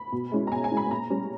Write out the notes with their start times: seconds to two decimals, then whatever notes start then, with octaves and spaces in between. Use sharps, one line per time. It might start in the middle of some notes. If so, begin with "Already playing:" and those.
Already playing: B5
0.12 B2
0.32 G#3 C#4 E4
0.47 A#5
0.51 B2 G#5
0.64 G#5
0.71 G#3 C#4 E4
0.77 B5
0.91 A#2 A#5
1.10 G3 C#4